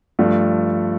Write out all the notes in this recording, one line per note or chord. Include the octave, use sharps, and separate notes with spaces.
G2 F3 A3